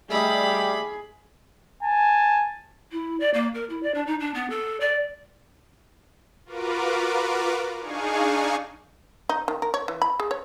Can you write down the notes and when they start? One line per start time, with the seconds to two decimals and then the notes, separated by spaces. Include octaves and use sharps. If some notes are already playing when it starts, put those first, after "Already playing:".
0.10 G3 A3 D#4 G#4 B5
1.83 G#5 A5
2.92 E4
3.20 D5
3.34 A#3
3.54 A#4
3.69 E4
3.83 D5
3.94 D4
4.06 D#4
4.20 D4
4.34 B3
4.50 A4
4.80 D5
6.45 F4 F#4 A#4 B4 D6
7.79 D4 D#4 G#4 F5 G#5 C#6
9.29 D#4
9.48 D#3
9.62 A#4
9.74 C#5
9.88 E3
10.02 B5
10.20 G#4
10.31 C#5